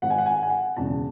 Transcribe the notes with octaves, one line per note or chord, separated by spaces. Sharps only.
G#1 G#2 D#3 F#5
G#5
F#5
G#5
F#5
G#5
F#5
E1 E2 C#3 A5